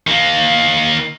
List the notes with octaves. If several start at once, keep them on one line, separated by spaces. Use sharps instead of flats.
D#3 A#3